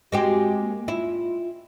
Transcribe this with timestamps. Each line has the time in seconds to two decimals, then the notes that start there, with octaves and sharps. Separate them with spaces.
0.12 G#3 C4 F#4 G4
0.61 A#3
0.88 E4 F4